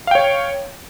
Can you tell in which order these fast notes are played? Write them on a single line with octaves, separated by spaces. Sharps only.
F5 G5 C#5